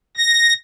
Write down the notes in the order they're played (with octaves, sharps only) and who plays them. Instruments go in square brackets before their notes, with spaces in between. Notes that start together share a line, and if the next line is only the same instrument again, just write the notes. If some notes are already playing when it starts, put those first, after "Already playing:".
[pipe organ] A#6